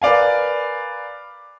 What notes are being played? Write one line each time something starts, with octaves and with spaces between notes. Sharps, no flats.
A#4 B4 D5 F5 G#5